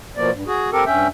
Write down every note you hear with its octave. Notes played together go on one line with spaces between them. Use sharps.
B2 F3 A#3 D5
G2
F#4 G#4
C4 G4 A4 A#4
G2 C#4 E5 G5